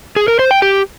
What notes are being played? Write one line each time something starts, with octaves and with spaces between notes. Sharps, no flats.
G#4
A#4
C5
G5
G4